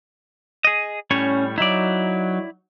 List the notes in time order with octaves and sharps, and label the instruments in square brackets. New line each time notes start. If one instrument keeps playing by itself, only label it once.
[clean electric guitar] G#4 D#5
[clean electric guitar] A2 G3 C#5 [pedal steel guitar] C#4
[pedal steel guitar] F#3 D#4 [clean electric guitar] E4 D5